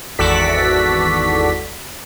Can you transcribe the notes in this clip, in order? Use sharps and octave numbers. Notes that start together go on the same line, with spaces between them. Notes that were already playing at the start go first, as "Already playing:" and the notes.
G#1 E2 F#4 A4 D5 B6